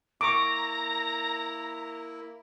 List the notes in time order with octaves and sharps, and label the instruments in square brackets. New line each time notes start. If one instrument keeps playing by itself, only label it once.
[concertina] A#3 E4 [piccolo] A#5 [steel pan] C#6 D6